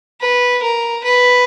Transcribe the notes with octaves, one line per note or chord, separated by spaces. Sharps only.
B4
A#4
B4